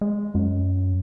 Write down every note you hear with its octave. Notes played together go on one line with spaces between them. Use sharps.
G#3
F#2